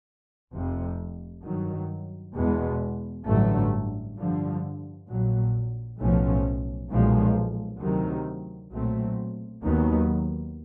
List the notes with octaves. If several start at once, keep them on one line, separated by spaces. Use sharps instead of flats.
F1 F2 C3
G2 D#3 F#3
E2 B2 G#3 B3
A1 G2 D3 F#3 A3
G2 D3 F3
A#1 A#2 F#3
B1 A2 F3 A3 C#4
B1 A#2 F3 G#3
D2 C3 D#3 F#3
B1 A#2 F#3 A3 C4
D#2 D#3 F#3 B3